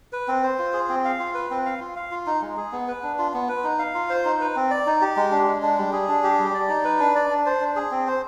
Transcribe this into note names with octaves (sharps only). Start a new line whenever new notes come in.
B4
C4
C5
F4
G#4
C4
F5
F4
B4
C4
F5
F4
F5
F4
D#4
G#3
G#4
B3
B4
D4
F4
B3
B4
D#4
F5
F4
C5
D#4
B4
C4
D5
D#4
G4
G#3
D4
G#3
D4
G3
G#4
D4
G4
G3
D5
D#4
B4
D4
D5
D4
C5
D4
G#4
C4
C5